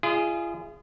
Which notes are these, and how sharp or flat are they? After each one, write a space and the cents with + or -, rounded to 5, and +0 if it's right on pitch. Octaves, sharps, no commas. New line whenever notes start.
F4 -40 G#4 +0 D#5 -25